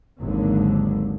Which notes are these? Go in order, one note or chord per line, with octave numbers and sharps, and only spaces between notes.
G#1 D#2 D3 F#3